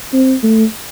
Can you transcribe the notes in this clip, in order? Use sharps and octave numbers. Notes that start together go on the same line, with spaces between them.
C4
A3